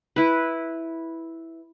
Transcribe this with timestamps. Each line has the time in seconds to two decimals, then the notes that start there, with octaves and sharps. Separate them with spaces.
0.16 E4 B4